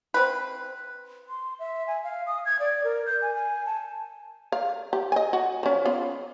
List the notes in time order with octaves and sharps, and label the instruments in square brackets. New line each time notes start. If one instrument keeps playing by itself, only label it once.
[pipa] C4 B4
[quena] C6
E5
G#5
F5
D#6
G#6
D5
A#4
G6
G#5
G#5
A5
[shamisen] F5
G4
D#5 G#5
F#4
F3 C#4
B3 F4